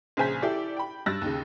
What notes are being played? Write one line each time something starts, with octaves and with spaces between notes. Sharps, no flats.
A#1 C#3 C5 G#5 G6 B6
E4 G4 A4 D5
G5 B5
G2 E6 F#6 A6 A#6
D#2 C#3